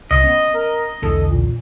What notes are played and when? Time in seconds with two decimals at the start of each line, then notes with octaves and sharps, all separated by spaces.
0.11 C2 D#5
0.24 B3 C#4
0.54 A#4
1.02 B1 E2 D3 A4
1.27 A#2